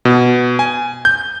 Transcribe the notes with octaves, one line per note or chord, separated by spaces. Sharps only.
B2
G#5
G6